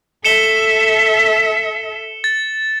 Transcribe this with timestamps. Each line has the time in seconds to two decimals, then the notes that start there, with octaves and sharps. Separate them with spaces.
0.25 A4 E5 C#7 E7 G7
2.24 A6